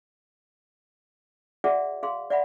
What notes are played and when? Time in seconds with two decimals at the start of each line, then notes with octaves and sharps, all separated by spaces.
1.64 F#4 G#4 D5 E5 F#5
2.03 G#4 F5 C6
2.30 D5 E5 F#5 B5